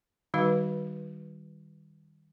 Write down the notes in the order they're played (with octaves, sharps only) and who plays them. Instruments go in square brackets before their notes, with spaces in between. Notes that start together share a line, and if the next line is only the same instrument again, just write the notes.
[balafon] D#3 G3 D#4 F#4 B4 F5